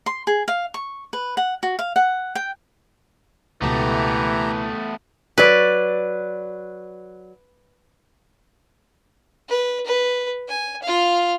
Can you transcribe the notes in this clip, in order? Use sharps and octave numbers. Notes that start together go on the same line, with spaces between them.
C6
G#4
F5
C#6
B4
F#5
F#4
F5
F#5
G5
C#2 B2 E3 A3 B3 G4 A#5
F#3 B4 D5
B4
B4
G#5
F4 F5